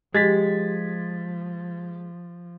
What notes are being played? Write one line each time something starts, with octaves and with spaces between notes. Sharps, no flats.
F3 G#3 G4 G#6 A6 B6